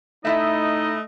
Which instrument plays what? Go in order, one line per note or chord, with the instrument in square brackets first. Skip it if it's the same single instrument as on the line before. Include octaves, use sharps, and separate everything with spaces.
[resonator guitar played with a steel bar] A2 E4 E5 [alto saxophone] A3 [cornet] D#4 [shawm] D#5